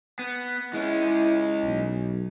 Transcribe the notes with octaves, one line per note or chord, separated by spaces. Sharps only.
B3
G#3 C#4 E4
B1